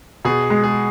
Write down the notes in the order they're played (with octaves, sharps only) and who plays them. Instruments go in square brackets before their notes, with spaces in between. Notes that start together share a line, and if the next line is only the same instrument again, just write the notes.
[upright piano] B2 [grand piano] G#4
[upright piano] G#3
[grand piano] G#4